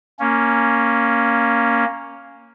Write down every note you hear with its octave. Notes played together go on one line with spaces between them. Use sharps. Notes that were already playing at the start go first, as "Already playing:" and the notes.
A#3 C#4